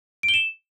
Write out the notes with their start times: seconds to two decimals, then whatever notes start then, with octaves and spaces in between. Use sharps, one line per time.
0.23 D7
0.29 G7
0.34 E7